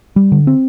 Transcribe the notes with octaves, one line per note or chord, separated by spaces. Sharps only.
G3
D3
C4